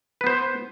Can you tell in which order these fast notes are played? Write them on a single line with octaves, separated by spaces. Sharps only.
B4 B3 C5